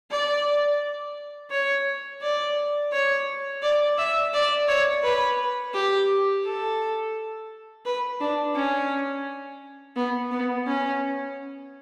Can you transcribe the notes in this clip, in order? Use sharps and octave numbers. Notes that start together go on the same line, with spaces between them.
D5
C#5
D5
C#5
D5
E5
D5
C#5
B4
G4
A4
B4
D4
C#4
B3
B3
C#4